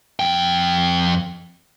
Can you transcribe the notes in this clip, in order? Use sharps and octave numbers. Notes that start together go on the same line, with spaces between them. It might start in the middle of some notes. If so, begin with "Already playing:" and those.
F2 G5